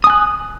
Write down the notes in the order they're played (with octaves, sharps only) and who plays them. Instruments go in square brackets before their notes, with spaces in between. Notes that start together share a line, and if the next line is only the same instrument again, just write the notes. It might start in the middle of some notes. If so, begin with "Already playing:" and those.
[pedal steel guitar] D#6
G#5
F#6